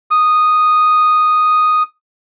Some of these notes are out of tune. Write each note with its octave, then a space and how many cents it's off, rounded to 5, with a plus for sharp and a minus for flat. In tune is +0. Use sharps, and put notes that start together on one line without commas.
D#6 -5